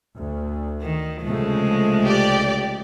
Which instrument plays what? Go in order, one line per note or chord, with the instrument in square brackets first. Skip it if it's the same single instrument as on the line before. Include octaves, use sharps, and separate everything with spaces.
[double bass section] D2
[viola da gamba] D#3
[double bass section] C2 C#3 A3 [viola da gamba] F3 G#3
[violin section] G4 D5